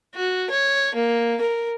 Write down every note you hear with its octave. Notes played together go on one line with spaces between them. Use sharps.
F#4
C#5
A#3
A#4